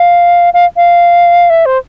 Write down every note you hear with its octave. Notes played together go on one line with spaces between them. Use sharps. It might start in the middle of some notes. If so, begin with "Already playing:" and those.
Already playing: F5
F5
F5
E5
C5